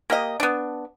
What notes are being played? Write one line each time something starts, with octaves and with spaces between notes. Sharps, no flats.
A#3 G4 D#5
B3 D4